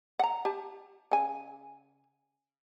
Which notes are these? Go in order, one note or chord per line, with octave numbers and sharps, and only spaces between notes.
F#5 A#5
G4 A5
C#3 G#5